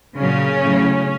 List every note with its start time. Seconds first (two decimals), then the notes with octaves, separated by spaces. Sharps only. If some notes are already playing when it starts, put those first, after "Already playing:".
0.19 A#2 C#3 F#3 C#4
0.64 A2 F#3